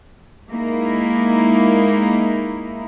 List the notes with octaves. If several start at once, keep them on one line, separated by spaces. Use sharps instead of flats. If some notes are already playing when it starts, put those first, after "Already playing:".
G#3 A#3 D#4 E4